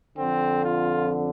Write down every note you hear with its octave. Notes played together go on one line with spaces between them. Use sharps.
F2 D3 C4
F4